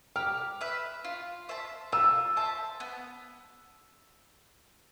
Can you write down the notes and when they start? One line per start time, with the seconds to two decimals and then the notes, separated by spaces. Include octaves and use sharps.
0.16 G4 F6
0.61 B4 E5
1.04 F4
1.49 C5 E5 A5
1.92 F4 E6
2.37 C5 E5 A5
2.80 B3